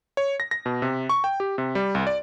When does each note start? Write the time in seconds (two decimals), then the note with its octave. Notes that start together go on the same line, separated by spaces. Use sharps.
0.17 C#5
0.40 A#6
0.51 A#6
0.66 B2
0.82 C3
1.09 C#6
1.24 G5
1.40 G4
1.58 C3
1.75 G3
1.95 C2
2.07 D5